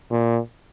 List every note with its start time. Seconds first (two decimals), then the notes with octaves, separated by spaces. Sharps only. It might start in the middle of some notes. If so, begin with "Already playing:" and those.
0.11 A#2